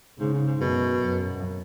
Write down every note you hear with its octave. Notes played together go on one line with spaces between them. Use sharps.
G#2 C#3
G#2
G#2
F#2 B2
F#2